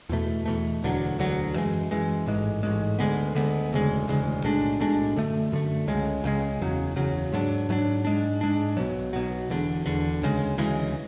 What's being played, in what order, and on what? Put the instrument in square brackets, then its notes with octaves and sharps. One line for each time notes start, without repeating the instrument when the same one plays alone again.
[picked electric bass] E2 B2 A3
E2 B2 A3
E1 D2 D3 F#3
E1 D2 D3 F#3
F#2 E3 G#3
F#2 E3 G#3
A1 G#2 G#3
A1 G#2 G#3
D2 D3 G#3 B3
D2 D3 G#3 B3
E1 D2 C#3 G#3
E1 D2 C#3 G#3
B1 A2 G#3 D4
B1 A2 G#3 D4
F#2 D3 A3
F#2 D3 A3
C#2 C#3 G#3
C#2 C#3 G#3
F#1 E2 C#3 F#3
F#1 E2 C#3 F#3
G#2 F#3 A3 D4
G#2 F#3 A3 D4
G#2 G#3 D4
G#2 G#3 D4
B1 B2 F#3
B1 B2 F#3
E1 E2 D3
E1 E2 D3
D2 C#3 E3 G#3
D2 C#3 E3 G#3